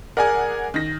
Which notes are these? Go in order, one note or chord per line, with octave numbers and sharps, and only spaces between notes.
G#4 A#4 D5 F#5 G#5
D#3 A#6